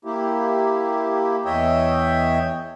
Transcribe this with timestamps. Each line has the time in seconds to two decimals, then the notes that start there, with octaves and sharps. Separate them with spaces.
0.05 A#3 E4 G4
1.45 E2 C#5 D#5 E5 G5